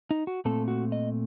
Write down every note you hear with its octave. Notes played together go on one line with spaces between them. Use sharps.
D#4
F#4
A#2 A3 C4 A4
F#4
D#5